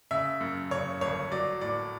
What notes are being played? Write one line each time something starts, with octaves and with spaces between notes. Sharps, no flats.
C#3 E5
F#2
C#3 C#5
G1 C#5
F#3 D5
A2 D5